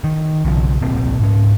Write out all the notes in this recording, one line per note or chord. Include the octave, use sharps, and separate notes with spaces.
D#3
B1 C#3 F3
D1 B1 A#2 C4
G#2 C#4